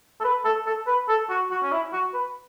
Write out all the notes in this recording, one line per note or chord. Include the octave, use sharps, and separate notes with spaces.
A4
B4
A4
A4
B4
A4
F#4
F#4
C#4
E4
F#4
B4